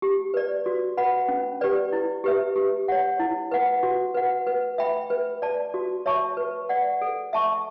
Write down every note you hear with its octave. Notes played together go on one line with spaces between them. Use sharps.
G4
B4 D5
F#4
B4 F#5 B5
C#4
G4 B4 D5
E4
G4 B4 E5
G4
C#5 F#5
E4
B4 F#5
F#4
B4 F#5
B4
E5 G5 B5
B4
D5 A5
F#4
C#5 E5 A5 C#6
B4
D5 F#5
A4
E5 A5 C#6